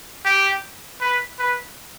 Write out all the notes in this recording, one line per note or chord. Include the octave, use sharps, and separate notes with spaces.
G4
B4
B4